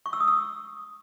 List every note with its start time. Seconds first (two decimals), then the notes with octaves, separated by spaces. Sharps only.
0.06 C#6
0.13 E6
0.20 D#6
0.28 E6